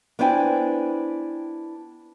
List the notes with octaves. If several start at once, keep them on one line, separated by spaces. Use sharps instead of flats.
B3 D4 E4 C5 G5 G#5